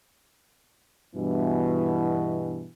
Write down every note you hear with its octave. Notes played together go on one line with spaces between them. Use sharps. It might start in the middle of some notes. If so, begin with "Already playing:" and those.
G2 B2 E3